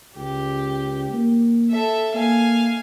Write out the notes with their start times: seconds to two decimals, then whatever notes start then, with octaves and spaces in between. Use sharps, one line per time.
0.16 C#2 G4
1.12 A#3
1.70 A4 E5
2.15 A#3 F5 G#5